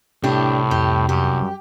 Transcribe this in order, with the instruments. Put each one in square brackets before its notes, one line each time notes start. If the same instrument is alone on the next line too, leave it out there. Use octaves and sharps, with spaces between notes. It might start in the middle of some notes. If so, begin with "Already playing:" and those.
[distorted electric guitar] C2 [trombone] A2 [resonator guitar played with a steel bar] D4 G4
[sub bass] F2 [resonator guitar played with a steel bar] G4
[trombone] F#2 [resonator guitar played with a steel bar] G4